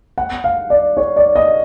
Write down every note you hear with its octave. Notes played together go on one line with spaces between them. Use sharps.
F#5
F5
D5
C#5
D5
D#5